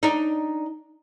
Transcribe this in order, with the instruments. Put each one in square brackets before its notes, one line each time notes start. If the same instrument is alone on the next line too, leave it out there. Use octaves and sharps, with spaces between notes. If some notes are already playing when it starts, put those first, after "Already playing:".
[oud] D4 D#4